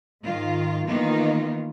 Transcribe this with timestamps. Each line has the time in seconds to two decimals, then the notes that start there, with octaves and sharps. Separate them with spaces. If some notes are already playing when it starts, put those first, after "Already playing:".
0.23 G#2 D#3 F4
0.88 D#3 E3 A#3 B3 D#4 F4